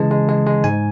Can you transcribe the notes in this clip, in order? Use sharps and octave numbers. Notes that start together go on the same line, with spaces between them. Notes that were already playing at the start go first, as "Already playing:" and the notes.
Already playing: C#3 E3 G#3 A5
G#3
G#3
G#3
G#2 G#5